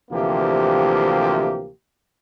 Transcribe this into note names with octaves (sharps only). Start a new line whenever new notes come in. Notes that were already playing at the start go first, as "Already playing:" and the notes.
D2 C3 E3 F3 A#3 G4